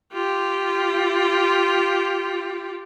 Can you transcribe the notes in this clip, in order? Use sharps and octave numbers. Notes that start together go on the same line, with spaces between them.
F4 G4